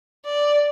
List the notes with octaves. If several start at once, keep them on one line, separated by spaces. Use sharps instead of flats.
D5